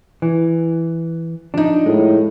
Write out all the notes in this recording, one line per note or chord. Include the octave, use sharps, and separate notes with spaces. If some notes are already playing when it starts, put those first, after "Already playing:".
E3
F3 D4 D#4
A2 G#3